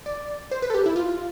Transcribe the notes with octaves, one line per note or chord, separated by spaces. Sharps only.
D5
C5
B4
A4
G4
E4
F4